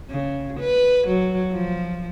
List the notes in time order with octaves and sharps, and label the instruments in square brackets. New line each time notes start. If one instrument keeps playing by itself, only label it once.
[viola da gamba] C#3
B4
F#3
F3